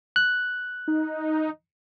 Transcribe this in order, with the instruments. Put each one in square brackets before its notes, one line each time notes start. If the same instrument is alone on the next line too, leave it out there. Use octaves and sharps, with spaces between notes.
[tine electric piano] F#6
[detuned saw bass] D#4